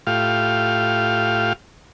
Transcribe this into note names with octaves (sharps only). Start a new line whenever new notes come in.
A2 F4 G4 F5